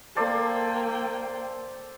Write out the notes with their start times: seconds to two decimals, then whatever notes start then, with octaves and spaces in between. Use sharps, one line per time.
0.16 A#3 A4 C5 D5 G5